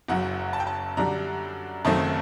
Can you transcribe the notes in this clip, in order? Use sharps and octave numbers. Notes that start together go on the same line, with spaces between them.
F#1 F#2 F#3 F#5
A5
G5
A5
F#2 D3 G3 D4 A#5
F#1 F#2 D#3 A3 C4 A5